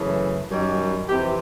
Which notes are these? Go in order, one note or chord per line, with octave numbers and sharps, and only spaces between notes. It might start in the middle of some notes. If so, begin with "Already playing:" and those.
Already playing: F#2 C#3 E3 A3
F#2 D#3 G3
F2 C3 E3 G4